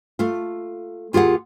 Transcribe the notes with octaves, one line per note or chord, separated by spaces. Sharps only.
A3 F4
D#2 F4 G4 G#4 F#5